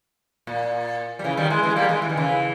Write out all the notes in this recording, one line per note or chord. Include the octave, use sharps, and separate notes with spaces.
A#2
G3
C#3 E3
D#3 G3
E3 G#3
E3 G#3
G3 A#3
E3 G#3
E3
D#3
C#3 E3